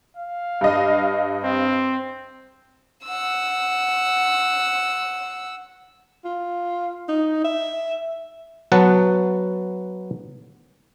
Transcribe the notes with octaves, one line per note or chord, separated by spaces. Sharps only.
F5
G2 D#5
C4
F#5 E6
F4
D#4
E5
F#3 B3 B4 F#5 A5